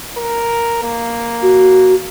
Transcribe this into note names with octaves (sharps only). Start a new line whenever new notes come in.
A#4
A#3
F#4